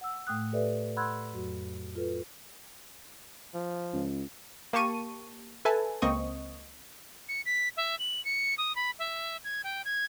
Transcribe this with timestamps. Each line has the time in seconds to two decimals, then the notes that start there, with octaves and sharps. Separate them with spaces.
0.01 F#5 E6
0.27 A2 A3 G5 D#6 F#6
0.53 G4 A4 B4 D5 E5
0.96 F#5 B5 C6 E6 F#6 G#6
1.33 F2 F#3 F#4
1.95 F4 A4 B4
3.54 F3
3.93 C#2
4.73 A#3 G4 A5 C#6 D#7
5.65 A4 B4 E5 G#5 A5
6.02 C#2 A#3 C4 D#5 C#6 D#6
7.28 C#7
7.46 B6
7.77 E5
7.99 F#7
8.25 C#7
8.58 D#6
8.76 B5
8.99 E5
9.44 G#6
9.64 G5
9.85 G#6